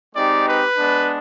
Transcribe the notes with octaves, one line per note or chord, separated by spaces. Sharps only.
G#3 C4 D#4 G4 D5
B4
G#3 B3 D4